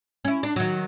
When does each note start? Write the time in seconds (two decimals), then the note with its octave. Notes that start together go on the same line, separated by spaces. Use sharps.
0.25 C#4 E4
0.43 D4
0.56 D#3 F#3